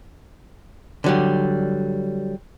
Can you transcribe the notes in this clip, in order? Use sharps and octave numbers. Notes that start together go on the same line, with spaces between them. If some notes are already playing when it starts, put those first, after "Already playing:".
D3 F#3 G3